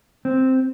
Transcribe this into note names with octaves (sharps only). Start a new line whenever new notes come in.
C4